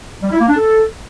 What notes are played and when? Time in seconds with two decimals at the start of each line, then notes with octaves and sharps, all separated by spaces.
0.23 G3
0.31 E4
0.40 A#3
0.49 D4
0.57 A4